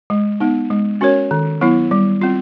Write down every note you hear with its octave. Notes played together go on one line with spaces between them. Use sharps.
G#3
B3 D#4
G#3
C#4 F#4 A#4 C#5
D#3
F#3 B3 E4
G3
C4 F4